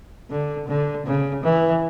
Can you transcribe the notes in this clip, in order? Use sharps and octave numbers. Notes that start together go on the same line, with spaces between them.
D3
D3
C#3
E3